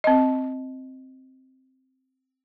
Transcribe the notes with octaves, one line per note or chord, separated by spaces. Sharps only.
C4 D#5